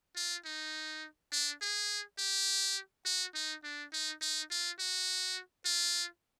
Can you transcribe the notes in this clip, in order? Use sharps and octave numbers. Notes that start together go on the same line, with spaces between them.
F4
D#4
D4
G#4
G4
F#4
D#4
D4
D#4
D#4
F4
F#4
F4